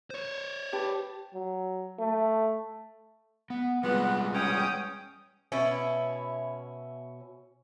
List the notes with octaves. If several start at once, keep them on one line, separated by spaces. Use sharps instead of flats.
C5 C#5
G4 B4 A5
F#3
A3
B3
G3 G#3 B3 F4
B3 C#4 G5 D#6
B2 C#4 E4